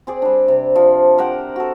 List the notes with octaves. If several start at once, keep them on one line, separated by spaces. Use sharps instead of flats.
C4 G#4 D5
G3 D4
C3
F3
G4 A#4 C5 F#5
F#4 A4